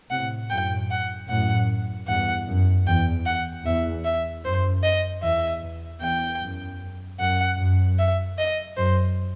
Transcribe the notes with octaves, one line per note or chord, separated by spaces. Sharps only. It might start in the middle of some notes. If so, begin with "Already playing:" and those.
A2 C3 F#5
F#2 A2 G5
F#5
F#2 A2 F#5
E2 G2 F#5
F#2
E2 G5
F#5
E2 E5
E5
F#2 C5
D#5
E2 E5
E2
E2 G5
F#2
F#2 F#5
F#2
E5
D#5
F#2 C5